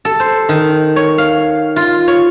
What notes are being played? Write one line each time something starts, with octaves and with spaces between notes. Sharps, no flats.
A4
C5
D#3
C#5
F5
F4
C#5